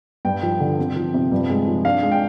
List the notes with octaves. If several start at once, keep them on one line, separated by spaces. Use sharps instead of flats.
G2 G5
F3
D3
C4
F3
C3
G2
G#3
F3
D4 F5
G#3
G5